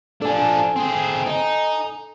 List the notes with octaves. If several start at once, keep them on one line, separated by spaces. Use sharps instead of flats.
F3 D4 A4 G#5
C4 G#4
D#4